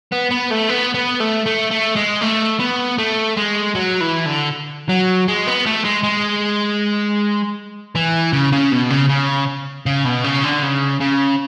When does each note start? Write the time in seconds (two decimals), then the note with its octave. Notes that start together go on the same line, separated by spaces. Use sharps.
0.12 B3
0.31 B3
0.50 A3
0.69 B3
0.95 B3
1.20 A3
1.46 A3
1.71 A3
1.96 G#3
2.22 A3
2.60 B3
2.98 A3
3.37 G#3
3.75 F#3
4.01 E3
4.26 D3
4.89 F#3
5.28 G#3
5.47 B3
5.66 A3
5.84 G#3
6.03 G#3
7.95 E3
8.33 C#3
8.52 C#3
8.72 B2
8.90 C#3
9.09 C#3
9.86 C#3
10.05 B2
10.24 C#3
10.43 D3
10.63 C#3
11.01 C#3